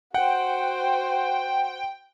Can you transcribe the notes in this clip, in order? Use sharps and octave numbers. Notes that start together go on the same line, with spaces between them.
F#4 C5 F#5 G5